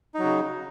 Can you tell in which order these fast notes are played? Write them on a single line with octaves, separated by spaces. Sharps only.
D#4 F#3 C#3